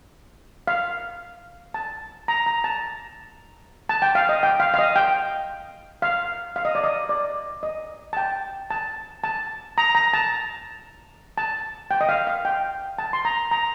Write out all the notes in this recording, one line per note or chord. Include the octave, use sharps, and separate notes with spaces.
F5
A5
A#5
A#5
A5
A5
G5
F5
D#5
G5
F5
F5
D#5
G5
F5
F5
D#5
D5
D#5
D5
D#5
A5
G5
A5
A5
A#5
A#5
A5
A5
G5
D#5
F5
F5
G5
A5
C6
A#5
A#5